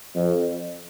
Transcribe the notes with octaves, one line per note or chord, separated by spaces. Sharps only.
F2